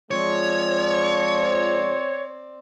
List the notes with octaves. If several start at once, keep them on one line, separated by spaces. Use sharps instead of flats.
F3 G#3 C4 C#5 D5